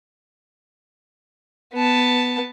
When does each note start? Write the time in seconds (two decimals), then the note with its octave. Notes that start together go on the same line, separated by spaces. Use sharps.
1.74 B3 A5